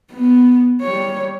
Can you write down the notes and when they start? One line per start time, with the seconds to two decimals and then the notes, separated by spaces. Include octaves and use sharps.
0.12 B3
0.82 G3 C#5